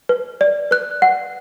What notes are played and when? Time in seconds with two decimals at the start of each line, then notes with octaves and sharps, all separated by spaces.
0.09 B4
0.41 D5
0.71 B4 F#6
1.02 F#5